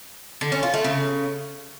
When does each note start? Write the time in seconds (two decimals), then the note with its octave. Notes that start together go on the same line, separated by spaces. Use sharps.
0.41 D3
0.52 C#4
0.63 F4
0.74 A3
0.84 C#3